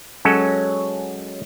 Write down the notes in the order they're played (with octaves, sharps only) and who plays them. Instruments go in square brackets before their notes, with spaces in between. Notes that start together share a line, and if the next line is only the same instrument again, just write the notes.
[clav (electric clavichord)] F#3 G#3 C#4 F#4 A4